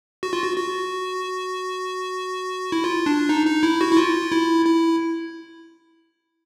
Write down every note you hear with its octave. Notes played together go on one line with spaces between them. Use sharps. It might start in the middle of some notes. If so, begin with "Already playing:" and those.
F#4
F4
F#4
F#4
E4
F4
D4
D#4
D#4
E4
F#4
E4
F4
E4
E4